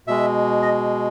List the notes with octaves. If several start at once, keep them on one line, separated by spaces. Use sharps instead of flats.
B2 G#3 E5
D#5